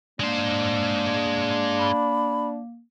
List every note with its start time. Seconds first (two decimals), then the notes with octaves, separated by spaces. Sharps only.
0.20 G#3 A#3 D4 C5
1.79 B5